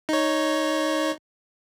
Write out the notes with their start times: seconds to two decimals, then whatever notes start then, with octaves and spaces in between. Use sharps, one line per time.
0.09 D#4 C#5